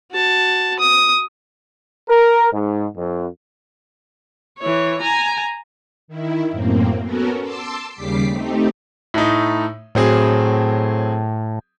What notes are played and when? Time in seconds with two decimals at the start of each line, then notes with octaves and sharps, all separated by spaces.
0.12 F#4 A5
0.79 D#6
2.10 A#4
2.52 G#2
2.97 F2
4.58 E3 C#5
5.01 G#5 A#5
6.08 D#3 E4
6.50 F#2 A2 A#3 C4
7.02 B3 C#4 F#4 A4 A#4
7.42 A5 C6 D6 E6
7.93 D#2 C#3 G3 D6 B6 C7
8.29 A3 C4 D#4 G4
9.14 A2 A3 D#4
9.95 A2 F#3 C4 G#4